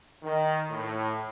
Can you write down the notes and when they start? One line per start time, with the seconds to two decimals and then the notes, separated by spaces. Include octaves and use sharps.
0.23 D#3
0.70 A2